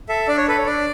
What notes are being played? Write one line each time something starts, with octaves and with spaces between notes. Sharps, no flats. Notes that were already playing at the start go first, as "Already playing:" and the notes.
A4 E5
D4 D5
C#5
A4 B4
C#5
D4 D5